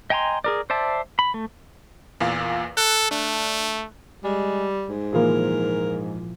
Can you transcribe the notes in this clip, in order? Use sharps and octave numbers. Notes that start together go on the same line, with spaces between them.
D#5 G5 G#5 A#5 C6
G#4 A#4 D5
C5 D5 E5 A5
B5
A3
E2 A#2 F5
A4 F#6
A3 D4
G3 G#3
G#2
A#2 E3 F3 A#3 F4 G#4 A#4